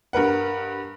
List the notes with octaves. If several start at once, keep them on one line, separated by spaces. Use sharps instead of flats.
G2 A#4 B4 F#5